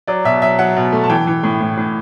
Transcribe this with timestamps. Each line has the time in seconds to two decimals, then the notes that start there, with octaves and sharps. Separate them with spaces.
0.07 F#3 D5
0.25 B2 E5
0.42 F#3 E5
0.59 F#3 F#5
0.77 B2
0.92 A3
1.04 A5
1.09 E3 G5
1.27 E3
1.44 A2
1.61 A2
1.78 A2